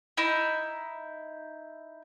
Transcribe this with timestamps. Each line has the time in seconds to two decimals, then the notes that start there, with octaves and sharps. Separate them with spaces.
0.17 D#4 E4